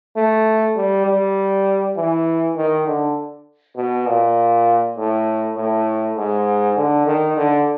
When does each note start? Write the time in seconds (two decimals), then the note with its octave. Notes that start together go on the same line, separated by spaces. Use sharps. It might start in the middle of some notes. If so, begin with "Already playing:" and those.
0.16 A3
0.76 G3
1.06 G3
1.96 E3
2.56 D#3
2.87 D3
3.77 B2
4.07 A#2
4.97 A2
5.56 A2
6.17 G#2
6.77 D3
7.06 D#3
7.37 D3